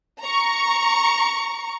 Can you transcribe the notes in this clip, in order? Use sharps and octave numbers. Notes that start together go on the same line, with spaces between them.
A#5 C#6